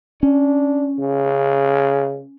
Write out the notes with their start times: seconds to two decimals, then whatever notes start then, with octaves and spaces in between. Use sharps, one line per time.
0.23 C#4 D4
0.99 C#3